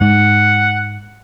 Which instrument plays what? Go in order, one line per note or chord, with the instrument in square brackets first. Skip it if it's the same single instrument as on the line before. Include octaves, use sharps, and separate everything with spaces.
[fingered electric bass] G#2 [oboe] F#5